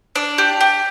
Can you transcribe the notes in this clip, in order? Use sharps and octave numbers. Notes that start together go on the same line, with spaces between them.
D4
G4
G4